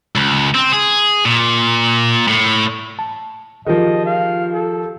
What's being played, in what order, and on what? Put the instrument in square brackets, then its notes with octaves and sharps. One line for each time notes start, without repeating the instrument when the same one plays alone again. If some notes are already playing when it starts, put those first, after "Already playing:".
[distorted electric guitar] C#2
C4
G#4
A#2
A2
[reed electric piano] A5
[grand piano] D#3 F3 [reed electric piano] F4 G4 G#4 [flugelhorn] D#5
[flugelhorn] F5
A4